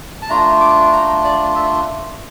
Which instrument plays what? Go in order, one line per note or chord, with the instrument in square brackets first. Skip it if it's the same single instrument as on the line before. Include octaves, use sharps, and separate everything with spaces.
[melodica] A5
A3 D4 F4 A#5
D6
A#5
D5
E5